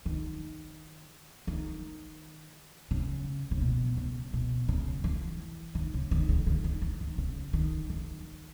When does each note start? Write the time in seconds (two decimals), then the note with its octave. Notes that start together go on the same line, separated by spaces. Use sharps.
0.06 D#3
1.47 D#3
2.91 C#3
3.51 C#3
3.62 B2
3.97 C#3
4.33 B2
4.69 C#3
5.04 E3
5.75 D#3
5.94 C#3
6.11 D#3
6.29 C#3
6.46 D#3
6.64 D#3
6.82 E3
7.01 D#3
7.18 C#3
7.53 D#3
7.90 D#3